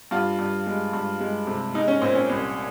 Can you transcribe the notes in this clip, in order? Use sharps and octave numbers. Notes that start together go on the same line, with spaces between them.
G2 F4
G2
G#3
G2
G#3
C3
G#3 D#4
C#4
A#2 C4
C#4
C2